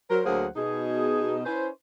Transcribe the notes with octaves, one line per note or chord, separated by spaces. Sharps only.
F#3 A#4 C5
D2 F#3 A#3 G#4 C5 F#5
B2 D#4 G#4
C#4 E4 B4 C5